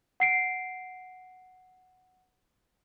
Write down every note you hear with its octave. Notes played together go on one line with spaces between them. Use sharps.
F#5 C7 D7